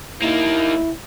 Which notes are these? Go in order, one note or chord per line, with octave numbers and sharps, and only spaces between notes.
A#3 D#4 E4